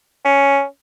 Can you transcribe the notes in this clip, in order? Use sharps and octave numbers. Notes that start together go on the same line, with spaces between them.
C#4